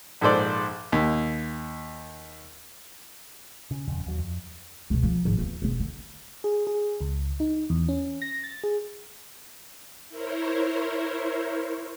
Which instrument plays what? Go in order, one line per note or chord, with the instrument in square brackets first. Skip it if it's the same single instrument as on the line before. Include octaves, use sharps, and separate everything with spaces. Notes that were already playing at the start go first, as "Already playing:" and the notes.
[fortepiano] A#1 G#2 A4 C5 D5
D#2
[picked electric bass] C#3
D#1 F2 C#3
D#2 F#3
F2
[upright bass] C#2 B2
F3
G#1 F3
E2 A#3
E1 B3
D3
[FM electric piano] G#4
G#4
C#2
D#4
E2
C#4
A#6
A6
G#4
[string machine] E4 A#4 C5 C#5